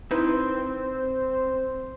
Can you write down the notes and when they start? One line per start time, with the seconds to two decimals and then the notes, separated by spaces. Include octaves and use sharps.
0.11 C4 D#4 E4 B4 C5